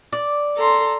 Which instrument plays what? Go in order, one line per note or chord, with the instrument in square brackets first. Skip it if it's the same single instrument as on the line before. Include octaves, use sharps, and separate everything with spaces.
[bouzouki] D5
[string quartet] A4 A#5 C6